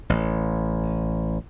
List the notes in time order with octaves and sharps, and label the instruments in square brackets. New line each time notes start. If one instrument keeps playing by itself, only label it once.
[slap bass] A1